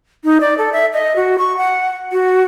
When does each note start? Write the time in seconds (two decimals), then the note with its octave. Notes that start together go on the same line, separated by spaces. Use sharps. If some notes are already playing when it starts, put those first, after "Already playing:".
0.25 D#4
0.41 D5
0.58 A4
0.73 E5
0.93 D#5
1.16 F#4
1.38 C#6
1.57 F#5
2.12 F#4